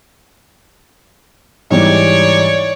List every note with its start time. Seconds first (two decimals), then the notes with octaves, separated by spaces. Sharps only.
1.70 G#2 E3 G3 C#5 D5